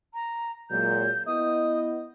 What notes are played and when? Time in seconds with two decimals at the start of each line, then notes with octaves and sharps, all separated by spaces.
0.14 A#5
0.71 A#2 F#3 G#3 G6
1.27 B3 E4 D#5 D#6